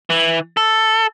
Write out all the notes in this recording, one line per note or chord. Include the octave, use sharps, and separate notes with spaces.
E3
A4